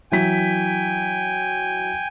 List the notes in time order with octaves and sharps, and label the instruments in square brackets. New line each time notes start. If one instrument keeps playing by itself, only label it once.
[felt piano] E3 F#3 B6 [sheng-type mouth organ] G5 G#5